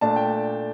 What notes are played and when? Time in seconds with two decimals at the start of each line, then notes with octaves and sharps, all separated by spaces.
0.01 A#2 A3 D4 A5
0.16 G5